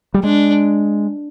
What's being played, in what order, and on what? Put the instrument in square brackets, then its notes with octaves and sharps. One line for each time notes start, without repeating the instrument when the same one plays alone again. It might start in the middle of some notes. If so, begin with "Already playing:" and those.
[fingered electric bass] G3
[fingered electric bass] G#3 [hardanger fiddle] D4